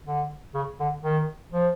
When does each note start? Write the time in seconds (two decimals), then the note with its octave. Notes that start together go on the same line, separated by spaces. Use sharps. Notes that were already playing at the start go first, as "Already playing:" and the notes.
0.07 D3
0.54 C#3
0.80 D3
1.03 D#3
1.52 F3